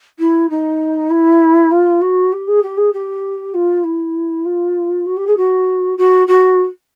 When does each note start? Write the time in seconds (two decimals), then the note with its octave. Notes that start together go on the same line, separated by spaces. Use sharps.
0.19 E4
0.50 D#4
1.10 E4
1.71 F4
2.01 F#4
2.33 G4
2.48 G#4
2.63 G4
2.77 G#4
2.93 G4
3.54 F4
3.84 E4
4.45 F4
5.06 F#4
5.17 G4
5.27 G#4
5.37 F#4
5.98 F#4
6.27 F#4